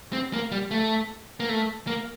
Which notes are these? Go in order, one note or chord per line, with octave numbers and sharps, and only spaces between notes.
C4
A#3
G3
A3
A#3
A3
A#3